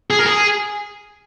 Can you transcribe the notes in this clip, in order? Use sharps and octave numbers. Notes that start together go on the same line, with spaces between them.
G#4
A#4
G#4